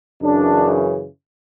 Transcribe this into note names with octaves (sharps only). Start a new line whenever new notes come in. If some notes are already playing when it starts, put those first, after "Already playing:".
F#2 C#3 E3 D4